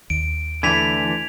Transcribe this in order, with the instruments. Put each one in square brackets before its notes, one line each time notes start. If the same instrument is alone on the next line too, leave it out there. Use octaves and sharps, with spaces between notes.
[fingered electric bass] D#2 [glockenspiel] D7
[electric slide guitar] D3 E3 A3 [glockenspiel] G#6 B6 F7